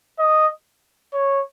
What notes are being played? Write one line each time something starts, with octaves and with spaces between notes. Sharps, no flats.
D#5
C#5